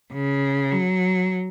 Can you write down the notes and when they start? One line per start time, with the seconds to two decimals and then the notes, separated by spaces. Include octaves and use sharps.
0.13 C#3
0.71 F#3